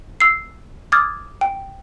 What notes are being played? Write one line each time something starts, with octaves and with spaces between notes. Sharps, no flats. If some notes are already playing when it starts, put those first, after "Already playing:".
E6 C7
D6 D#6 F6 G#6 A6
G5